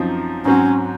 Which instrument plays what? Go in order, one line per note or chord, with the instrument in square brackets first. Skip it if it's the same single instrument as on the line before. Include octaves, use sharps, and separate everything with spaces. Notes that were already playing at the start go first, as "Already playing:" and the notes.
Already playing: [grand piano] F#2 F3 C4 D#4
[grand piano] G#2 F#3 C4 [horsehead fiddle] C#4